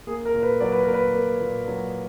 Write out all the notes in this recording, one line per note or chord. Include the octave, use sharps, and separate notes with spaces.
A#3 G#4
A#4
A#2
B4
F#3 D5
B4
A#2 A#4
B4
A#3
A#2
F#3